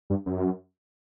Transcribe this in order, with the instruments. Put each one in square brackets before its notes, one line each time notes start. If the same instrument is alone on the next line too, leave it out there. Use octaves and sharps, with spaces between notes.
[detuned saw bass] G2
F#2